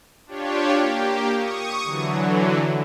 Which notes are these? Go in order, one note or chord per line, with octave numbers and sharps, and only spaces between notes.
D4 F4 G4 C#5
A#3 G4
C#6 D#6
D3 E3 F#3